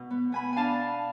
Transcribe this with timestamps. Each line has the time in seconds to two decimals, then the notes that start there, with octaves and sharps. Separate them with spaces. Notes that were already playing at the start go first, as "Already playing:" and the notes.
Already playing: B2
0.11 B3
0.32 B3 G#5 B5
0.53 D4 F5 G#5 A5